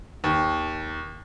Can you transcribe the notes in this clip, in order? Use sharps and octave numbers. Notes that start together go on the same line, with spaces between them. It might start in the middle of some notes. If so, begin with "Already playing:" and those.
D#2